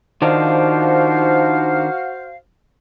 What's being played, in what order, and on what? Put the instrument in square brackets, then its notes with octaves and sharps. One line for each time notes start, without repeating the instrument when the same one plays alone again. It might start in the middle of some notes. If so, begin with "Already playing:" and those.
[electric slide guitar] D#3 D4 D#4 [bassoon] F3 [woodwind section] F#4 C5 F5